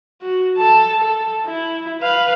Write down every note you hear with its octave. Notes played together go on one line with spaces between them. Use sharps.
F#4
A4 A5
A4
E4
B4 F5